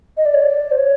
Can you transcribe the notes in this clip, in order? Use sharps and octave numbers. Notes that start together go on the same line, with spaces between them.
D#5
D5
C#5
D5
C5
C#5